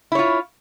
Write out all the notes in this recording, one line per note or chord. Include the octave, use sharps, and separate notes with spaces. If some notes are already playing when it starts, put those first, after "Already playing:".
E4 F4 C#5